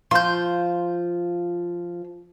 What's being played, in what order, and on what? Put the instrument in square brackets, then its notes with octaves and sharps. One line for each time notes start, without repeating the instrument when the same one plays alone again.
[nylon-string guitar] F3 F4 [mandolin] C6 G6